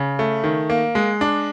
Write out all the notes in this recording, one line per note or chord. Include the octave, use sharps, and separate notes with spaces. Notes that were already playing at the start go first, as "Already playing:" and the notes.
Already playing: C#3
A3
D#3
A#3
G#3
D4